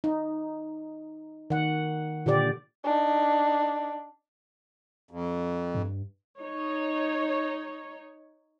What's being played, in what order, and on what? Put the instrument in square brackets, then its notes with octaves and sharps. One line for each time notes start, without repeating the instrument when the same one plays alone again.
[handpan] D#4
D#3 F#5
A#2 D3 G4 D5
[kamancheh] D4 D#4
[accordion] F2
[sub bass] G2
[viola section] D#4 C#5